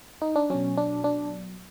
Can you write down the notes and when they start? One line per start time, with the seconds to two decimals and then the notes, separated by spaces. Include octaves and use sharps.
0.22 D#4
0.36 D4
0.50 B2 F#3 C#4
0.78 D4
1.04 D4